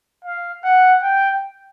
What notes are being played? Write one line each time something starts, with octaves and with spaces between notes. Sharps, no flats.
F5
F#5
G5